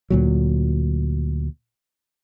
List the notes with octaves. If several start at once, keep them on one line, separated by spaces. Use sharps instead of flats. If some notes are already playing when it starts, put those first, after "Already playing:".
D2 A#2 F#3